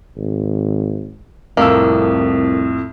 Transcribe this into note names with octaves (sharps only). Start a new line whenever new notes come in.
G#1
C2 F2 A2 A#3 E6